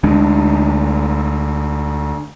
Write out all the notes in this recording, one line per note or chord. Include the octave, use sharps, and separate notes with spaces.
D2 G#3 D4